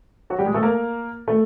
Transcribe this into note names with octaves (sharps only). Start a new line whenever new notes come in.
F#3 F#4
G3 G4
G#3 G#4
A3 A4
A#3 A#4
A3 A4